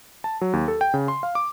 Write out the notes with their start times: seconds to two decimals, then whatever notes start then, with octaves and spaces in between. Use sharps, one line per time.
0.24 A5
0.41 F#3
0.53 D#2
0.68 A4
0.81 G5
0.94 C#3
1.08 C6
1.23 F5
1.35 D6